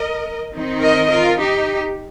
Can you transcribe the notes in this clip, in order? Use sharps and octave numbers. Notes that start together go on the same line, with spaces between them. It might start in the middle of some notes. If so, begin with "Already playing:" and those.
Already playing: A#4 D#5
D#3 C4 D#4
A#4 D#5
F4 A#4
D#4 G4